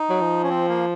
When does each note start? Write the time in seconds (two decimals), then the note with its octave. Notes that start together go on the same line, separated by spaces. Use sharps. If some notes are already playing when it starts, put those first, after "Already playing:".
Already playing: D#4
0.09 F#3
0.21 F3
0.43 C#4
0.50 C4
0.69 A#3